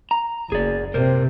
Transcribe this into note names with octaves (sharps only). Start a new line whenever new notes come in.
A#5
F#1 G#4 D5
C3 A#4 C5